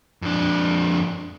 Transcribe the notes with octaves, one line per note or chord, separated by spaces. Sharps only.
F2 D4